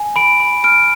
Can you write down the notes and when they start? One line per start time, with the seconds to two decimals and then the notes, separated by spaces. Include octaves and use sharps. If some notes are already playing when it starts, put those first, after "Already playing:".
Already playing: G#5
0.16 B5 D7
0.40 B5
0.64 F6 D7